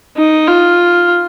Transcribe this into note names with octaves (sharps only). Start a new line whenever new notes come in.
D#4
F4